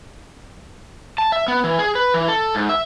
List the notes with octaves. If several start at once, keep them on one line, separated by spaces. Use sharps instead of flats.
A5
E5
B3
E3
G#4
B4
E3
A4
G#2
E5